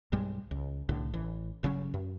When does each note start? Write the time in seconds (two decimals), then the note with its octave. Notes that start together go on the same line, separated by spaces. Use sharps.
0.12 B1 G2 G3 G#3
0.51 C#2
0.89 C2 A2 D3
1.14 A1 E3
1.63 G1 C#3 F#3 C#4
1.94 F#2